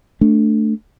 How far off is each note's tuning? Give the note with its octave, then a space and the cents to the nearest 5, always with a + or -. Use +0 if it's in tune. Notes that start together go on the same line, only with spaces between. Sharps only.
A3 +0 D4 +0